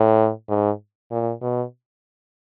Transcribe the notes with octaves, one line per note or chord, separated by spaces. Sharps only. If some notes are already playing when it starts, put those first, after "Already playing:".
Already playing: A2
G#2
A#2
B2